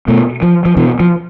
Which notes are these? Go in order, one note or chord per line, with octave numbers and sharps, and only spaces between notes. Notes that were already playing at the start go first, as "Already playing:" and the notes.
B2 A3
F3
F3
B2 E3
F3